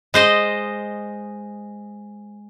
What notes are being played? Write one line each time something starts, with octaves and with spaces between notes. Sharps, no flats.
G#3 C5 D#5